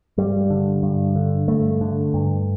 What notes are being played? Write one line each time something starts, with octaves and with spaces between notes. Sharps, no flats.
G2 G3
D3
G2
D3
G2 A3
D3
G2